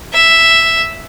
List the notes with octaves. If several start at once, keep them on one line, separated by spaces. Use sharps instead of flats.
E5